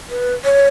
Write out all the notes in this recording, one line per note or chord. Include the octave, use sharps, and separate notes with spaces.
B4
C#5